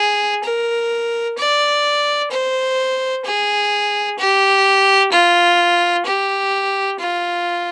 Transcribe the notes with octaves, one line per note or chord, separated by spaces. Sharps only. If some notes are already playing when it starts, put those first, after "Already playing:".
Already playing: G#4
A#4
D5
C5
G#4
G4
F4
G4
F4